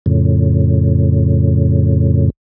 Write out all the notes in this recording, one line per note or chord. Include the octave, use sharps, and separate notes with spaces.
F2 A2 C#3